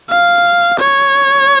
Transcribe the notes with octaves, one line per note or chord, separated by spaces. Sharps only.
F5
C#5